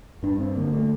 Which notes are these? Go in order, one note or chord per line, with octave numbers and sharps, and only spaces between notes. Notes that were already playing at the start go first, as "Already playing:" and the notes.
G2 D4
C4
D3 A#3
A3